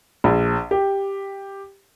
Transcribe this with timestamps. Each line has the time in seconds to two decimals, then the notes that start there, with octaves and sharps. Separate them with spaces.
0.24 A#1
0.71 G4